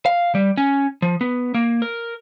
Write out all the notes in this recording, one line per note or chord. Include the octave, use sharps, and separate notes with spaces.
F5
G3
C#4
F3
B3
A#3
A#4